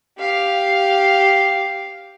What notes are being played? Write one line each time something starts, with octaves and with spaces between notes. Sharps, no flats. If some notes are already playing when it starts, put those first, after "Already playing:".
G4 F5